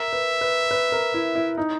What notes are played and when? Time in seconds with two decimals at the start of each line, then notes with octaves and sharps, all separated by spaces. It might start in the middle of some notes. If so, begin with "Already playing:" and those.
Already playing: A#4 E5
0.13 B4
0.41 B4
0.71 B4
0.92 A#4
1.14 E4
1.35 E4
1.57 D#4